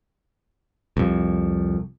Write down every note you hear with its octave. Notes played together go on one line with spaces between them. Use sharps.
C2 F2